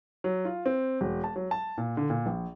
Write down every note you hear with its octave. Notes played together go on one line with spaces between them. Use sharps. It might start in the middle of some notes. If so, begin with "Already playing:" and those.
F#3
F4
C4
E1
A5
F#3
A5
A#2
D3
A#2
A#1